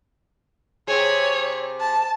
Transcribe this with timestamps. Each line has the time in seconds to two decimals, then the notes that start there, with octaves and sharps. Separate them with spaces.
0.88 C3 C4 G#4 C#5
1.81 A5